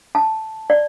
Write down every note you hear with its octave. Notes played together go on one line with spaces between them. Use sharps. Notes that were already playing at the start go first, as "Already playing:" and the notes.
A5
D5